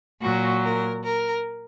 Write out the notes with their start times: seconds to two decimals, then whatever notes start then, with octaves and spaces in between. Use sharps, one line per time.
0.21 A#2 F#3 F#4
0.63 A#4
1.03 A#4